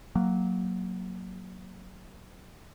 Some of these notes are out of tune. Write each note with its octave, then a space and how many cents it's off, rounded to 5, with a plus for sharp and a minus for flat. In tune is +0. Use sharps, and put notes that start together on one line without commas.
F#3 +0 A#3 +0